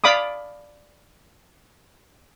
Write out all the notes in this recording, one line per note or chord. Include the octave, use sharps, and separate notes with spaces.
D5 F5 B5 D6 D#6